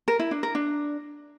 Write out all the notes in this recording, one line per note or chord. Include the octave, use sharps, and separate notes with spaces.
A#4
E4
D4
A#4
D4